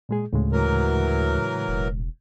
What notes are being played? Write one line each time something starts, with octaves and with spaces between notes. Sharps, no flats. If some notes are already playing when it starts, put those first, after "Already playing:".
A#2 G#3 G#4
D2 A2 C#3 G#3
E3 F#3 A#4
E1